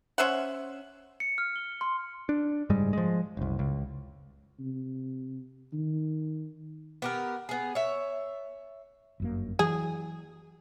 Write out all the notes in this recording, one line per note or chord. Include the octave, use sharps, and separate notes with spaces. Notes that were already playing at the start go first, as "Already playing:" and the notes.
C#4 C5 E5 F#5
C#7
F6
G7
C6
D4
F#1 G#2 G3 G#3
F3 G#3
F#1 C2
C#2
C3
D#3
B3 G4 A#4
B3 G#4
C#5 E5
G1 F#2 A#3
E3 F#3 G#4